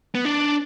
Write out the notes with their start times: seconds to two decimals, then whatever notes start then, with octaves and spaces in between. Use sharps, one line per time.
0.15 B3
0.25 D4